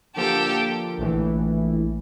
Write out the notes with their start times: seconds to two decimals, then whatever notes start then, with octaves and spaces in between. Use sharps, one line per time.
0.16 D3 F3 A#3 G4 A4
0.98 A#1 A2 E3